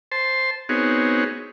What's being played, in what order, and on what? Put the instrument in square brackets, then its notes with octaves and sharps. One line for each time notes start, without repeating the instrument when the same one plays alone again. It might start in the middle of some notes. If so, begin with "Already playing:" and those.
[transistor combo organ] C5 A5 C6
B3 C4 D#4 F#4 G#4 C#5